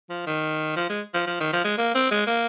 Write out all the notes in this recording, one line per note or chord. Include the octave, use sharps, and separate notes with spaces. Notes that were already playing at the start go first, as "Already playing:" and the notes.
F3
D#3
F3
G#3
F3
F3
D#3
F3
G#3
A#3
C4
G#3
A#3